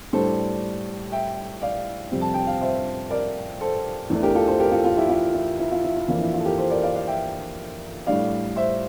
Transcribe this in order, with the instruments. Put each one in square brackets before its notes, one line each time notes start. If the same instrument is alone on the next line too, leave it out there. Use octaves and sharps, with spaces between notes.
[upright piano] A2 G3 D4 A4 C5
E5 G5
D5 F5
F2 C3 G3 C4
A5
G5
F5
C5 E5
A#4 D5
A4 C5
E2 E3 A3 D4
G4 A#4
F4 A4
A4 C5
G4 A#4
F4 A4
F4
E4 G4
F4
E4
E4
F4
E4
E4
F2 E3 A#3 D4 F4
E4
F4
A4
G4 A#4
A4 C5
A#4 D5
D5 F5
D5 F5
E5 G5
A2 G3 D4 D5 F5
C5 E5